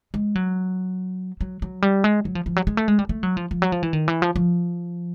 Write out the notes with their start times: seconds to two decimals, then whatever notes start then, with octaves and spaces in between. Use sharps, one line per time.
0.14 G#3
0.35 F#3
1.41 F#3
1.62 F#3
1.82 G3
2.04 G#3
2.25 F#3
2.35 F3
2.46 F3
2.56 F#3
2.67 G#3
2.77 A3
2.88 G#3
2.99 G3
3.09 A3
3.23 F#3
3.37 F3
3.51 F3
3.62 F#3
3.72 F3
3.83 E3
3.93 D#3
4.08 E3
4.22 F3
4.36 F3